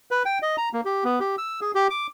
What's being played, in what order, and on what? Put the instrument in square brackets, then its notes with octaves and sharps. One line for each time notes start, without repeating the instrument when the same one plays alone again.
[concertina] B4
G5
D#5
A#5
A#3
G4
B3
G4
E6
G#4
G4
D6